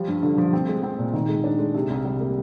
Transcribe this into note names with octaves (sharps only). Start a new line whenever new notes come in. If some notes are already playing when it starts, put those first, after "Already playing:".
Already playing: F3 G3
G2
D3
F3
C4
G#3
C4
A#2
D#3
G#3
D4
G#3
C3
C2
G3
A#3